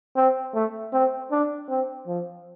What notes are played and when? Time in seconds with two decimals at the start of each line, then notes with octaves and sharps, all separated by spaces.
0.16 C4
0.54 A3
0.93 C4
1.31 D4
1.69 C4
2.07 F3